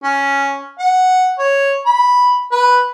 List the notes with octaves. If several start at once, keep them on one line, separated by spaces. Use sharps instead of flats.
C#4
F#5
C#5
B5
B4